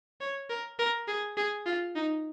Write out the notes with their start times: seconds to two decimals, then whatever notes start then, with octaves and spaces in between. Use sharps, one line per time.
0.21 C#5
0.50 A#4
0.79 A#4
1.08 G#4
1.37 G#4
1.66 F4
1.96 D#4